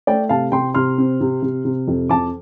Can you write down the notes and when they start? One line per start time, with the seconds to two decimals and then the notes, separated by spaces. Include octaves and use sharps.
0.07 A3 D5 G5
0.29 C3 F5 A5
0.52 C3 G5 C6
0.74 C3 C6 F6
0.98 C4
1.21 C3
1.42 C3
1.65 C3
1.87 F2
2.09 F2 A5 D6